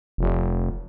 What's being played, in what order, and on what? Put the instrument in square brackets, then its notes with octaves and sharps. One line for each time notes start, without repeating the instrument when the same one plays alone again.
[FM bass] F1